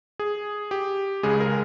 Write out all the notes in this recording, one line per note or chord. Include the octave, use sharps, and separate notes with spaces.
G#4
G4
C#2 C#3 G#3 G#4
A#4